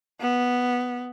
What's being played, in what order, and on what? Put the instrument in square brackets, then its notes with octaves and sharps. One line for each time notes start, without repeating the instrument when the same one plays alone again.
[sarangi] B3